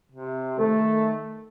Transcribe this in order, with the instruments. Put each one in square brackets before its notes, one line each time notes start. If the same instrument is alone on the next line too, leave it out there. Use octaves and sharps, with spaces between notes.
[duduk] C3
[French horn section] D#3 A4 [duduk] A3